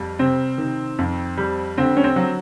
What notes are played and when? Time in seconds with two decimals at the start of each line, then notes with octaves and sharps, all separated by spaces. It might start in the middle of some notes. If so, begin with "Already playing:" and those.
Already playing: F2 G3
0.19 C3 C4
0.58 D#3
0.99 F2
1.38 G3
1.77 D3 C4
1.97 C#4
2.04 C4
2.16 F#3